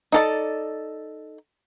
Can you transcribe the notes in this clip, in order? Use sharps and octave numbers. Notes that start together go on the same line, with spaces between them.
D#4 A4 D5